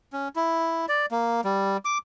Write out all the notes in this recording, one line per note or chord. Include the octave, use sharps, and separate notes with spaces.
C#4
E4
D5
A#3
G3
D6